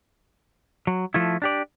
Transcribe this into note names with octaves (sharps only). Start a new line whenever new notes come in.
F#3
F3 A3 E4
D4 G4 D5